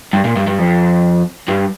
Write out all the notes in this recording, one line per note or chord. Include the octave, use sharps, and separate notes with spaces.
G2
A#2
G2
G2
F2
G2